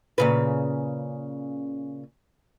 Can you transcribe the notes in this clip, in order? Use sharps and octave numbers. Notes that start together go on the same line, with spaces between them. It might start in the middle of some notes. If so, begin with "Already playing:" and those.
A#2 C#3 B4